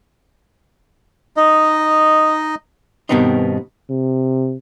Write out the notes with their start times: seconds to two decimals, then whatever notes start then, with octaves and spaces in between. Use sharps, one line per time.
1.37 D#4 D#5
3.09 G2 B2 D#3 B3 C4 D#4
3.90 C3